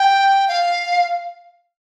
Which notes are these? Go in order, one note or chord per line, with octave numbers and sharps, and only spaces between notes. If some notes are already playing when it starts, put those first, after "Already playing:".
Already playing: G5
F5